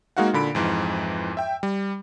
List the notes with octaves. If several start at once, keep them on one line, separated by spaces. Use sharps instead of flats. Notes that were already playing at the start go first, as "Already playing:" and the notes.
G#3 A#3 D#4 F#4 F5 F#5
A#2 D3 B5 D7
F2 G#2 E3
E5 G5
G3